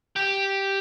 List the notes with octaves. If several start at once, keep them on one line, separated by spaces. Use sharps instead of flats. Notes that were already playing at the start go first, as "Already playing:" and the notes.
G4